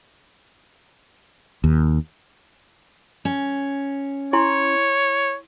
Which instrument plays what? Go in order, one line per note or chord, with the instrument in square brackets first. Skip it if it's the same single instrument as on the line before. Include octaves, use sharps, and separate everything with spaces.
[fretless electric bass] D#2
[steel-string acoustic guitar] C#4
[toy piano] E4 G#5 C6 [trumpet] C#5